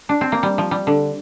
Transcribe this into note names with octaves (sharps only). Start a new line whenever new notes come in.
D4
C4
A#3
G3
F3
G3
D3